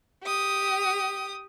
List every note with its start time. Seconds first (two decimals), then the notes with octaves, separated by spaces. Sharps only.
0.23 G4 D#6